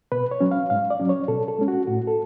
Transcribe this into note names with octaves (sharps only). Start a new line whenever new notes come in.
B2 B4
C#5
F#3 C#4
F5
G#2 F5
D5
F#3 C#4
C#5
B2 A4
A4
G#3 C#4
F#4
A2 F#4
A4